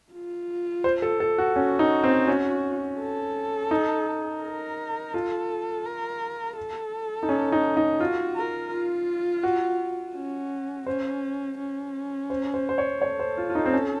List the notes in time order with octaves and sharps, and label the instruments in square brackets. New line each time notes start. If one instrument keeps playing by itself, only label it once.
[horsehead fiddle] F4
[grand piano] C5
A4
A4
F#4
[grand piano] C#4 [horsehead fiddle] F#4
[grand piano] D#4
C4
C#4
[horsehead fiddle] A4
[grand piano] D#4
[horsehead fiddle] A#4
[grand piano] F4 [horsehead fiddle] A4
[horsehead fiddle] A#4
A4
[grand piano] D#4
C#4
D#4
D#4
[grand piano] F4 [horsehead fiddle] F#4
[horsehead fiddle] A#4
F4
[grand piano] F#4
[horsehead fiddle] C#4
[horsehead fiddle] C#4 [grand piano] C5
[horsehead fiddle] C#4
[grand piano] C5
C5
C5
C#5
[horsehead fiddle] A4 [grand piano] C#5
[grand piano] C5
F4
F4
D#4
C4
C#4